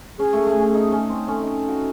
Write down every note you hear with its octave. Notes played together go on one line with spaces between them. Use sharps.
C#4 G#4
A3
A3
C#4
D#4
C#4
C4
C#4 A4
D#4
F#4